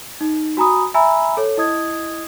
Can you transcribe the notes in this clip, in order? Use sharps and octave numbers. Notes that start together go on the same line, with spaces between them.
D#4
F#4 G#5 A#5 B5 D#6
E5 G#5 A#5 B5 E6
A4 C#5
E4 D#5 D#6 G#6